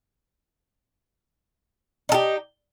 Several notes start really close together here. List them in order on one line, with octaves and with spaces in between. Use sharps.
D#4 A4 G4